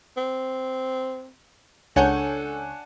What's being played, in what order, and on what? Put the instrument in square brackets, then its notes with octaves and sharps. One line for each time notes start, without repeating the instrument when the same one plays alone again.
[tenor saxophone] C4
[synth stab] C#2 C#5 G6 [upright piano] D4 F#5 G#5 [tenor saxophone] A4